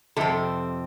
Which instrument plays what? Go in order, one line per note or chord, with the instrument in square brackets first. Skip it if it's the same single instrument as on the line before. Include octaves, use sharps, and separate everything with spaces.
[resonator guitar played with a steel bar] F2 C3 C4 A4